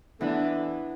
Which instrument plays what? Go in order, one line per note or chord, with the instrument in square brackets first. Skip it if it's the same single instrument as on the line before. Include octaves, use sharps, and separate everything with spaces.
[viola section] D3 D4 [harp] E3 B3 E4 B4